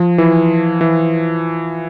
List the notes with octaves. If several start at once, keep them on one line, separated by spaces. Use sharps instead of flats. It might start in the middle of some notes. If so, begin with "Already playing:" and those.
Already playing: F3
E3
E3